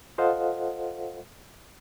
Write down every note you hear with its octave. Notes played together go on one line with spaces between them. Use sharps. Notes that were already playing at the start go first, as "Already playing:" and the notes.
F4 A4 C5 D#5 F5 F#5